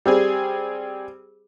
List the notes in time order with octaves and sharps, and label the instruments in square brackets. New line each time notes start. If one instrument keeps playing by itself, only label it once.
[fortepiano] G3 C4 G#4